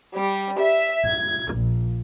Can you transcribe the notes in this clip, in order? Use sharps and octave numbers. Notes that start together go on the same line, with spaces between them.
G3
E5
G#6
A#1